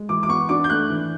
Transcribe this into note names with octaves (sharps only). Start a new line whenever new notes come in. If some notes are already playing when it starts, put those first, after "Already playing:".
Already playing: G#3
E3 D6
D6
B3 C#6
D4 D6
G6
A3 F#6
E3